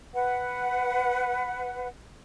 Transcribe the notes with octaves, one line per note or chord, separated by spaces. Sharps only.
B4 F#5